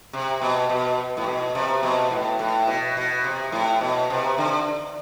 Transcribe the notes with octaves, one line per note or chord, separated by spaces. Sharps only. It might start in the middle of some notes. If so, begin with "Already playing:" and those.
C3
B2
B2
A2
B2
C3
B2
A2
A2
B2
B2
C3
A2
B2
C3
D3